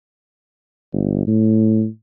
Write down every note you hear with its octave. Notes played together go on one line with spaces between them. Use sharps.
G1
A2